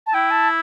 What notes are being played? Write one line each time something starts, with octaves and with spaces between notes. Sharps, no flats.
A5
E4 G5
A5